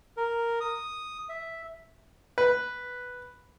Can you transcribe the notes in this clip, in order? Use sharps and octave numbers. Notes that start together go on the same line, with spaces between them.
A#4
D#6
E5
B4